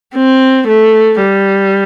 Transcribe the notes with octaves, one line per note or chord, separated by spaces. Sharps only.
C4
A3
G3